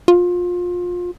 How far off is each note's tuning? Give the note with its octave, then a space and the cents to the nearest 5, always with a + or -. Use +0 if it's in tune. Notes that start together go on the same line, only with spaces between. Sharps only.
F4 +25